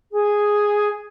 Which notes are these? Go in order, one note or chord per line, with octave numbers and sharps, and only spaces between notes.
G#4